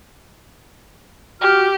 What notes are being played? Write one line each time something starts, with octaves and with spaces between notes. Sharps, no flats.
F#4 G4 F6